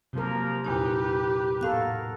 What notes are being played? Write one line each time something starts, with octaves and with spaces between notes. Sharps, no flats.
C3 F3 F#3 A#3 A#4
E2 A#2 D#4 G4 B4
A2 B3 A4 A#4 F5 F#6